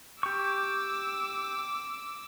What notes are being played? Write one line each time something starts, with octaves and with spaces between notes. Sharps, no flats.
G4 C#6 D6 E6